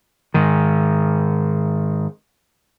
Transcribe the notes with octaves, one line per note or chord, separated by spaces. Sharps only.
G#2 D#3